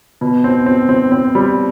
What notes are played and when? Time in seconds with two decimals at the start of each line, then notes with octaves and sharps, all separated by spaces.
0.21 B2
0.44 C4
0.66 C4
0.89 C4
1.12 C4
1.35 G3